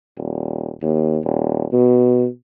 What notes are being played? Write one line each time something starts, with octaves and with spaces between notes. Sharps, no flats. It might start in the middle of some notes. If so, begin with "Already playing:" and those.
D#1
D#2
D#1
B2